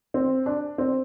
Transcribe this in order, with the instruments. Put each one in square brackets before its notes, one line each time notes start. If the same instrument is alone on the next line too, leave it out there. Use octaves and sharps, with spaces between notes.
[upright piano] C4
D4
C4